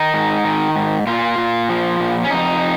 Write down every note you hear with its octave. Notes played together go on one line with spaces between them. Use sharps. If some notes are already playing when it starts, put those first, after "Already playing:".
Already playing: D#3 D#4
G#2
D#3
G#2
A#2 F4
A#2
F3
A#2
C#4
F2 D#4